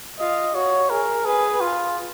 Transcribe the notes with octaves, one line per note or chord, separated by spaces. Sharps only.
F4 D#5
F#4 C#5
G#4 A#4
G#4 B4
F4